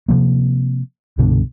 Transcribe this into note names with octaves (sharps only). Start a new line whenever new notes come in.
C3 F3 A#3
C2 G2 B2 D3